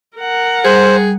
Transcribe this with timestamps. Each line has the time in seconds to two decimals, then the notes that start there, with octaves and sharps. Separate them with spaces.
0.17 A#4 F#5
0.65 G3 G#4 C5